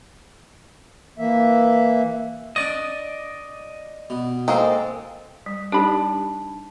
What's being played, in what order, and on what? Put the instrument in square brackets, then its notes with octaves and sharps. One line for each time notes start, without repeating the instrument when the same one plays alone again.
[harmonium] E3 A#3 E5
[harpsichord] D4 C#6 [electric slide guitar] D5 D#5
[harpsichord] B2
[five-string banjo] G#3 A#3 C4 [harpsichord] A4
[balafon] G3
[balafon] G3 D#4 G4 [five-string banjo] D4 B5